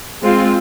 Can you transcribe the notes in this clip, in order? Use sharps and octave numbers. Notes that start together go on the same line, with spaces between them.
G#3 C4 F4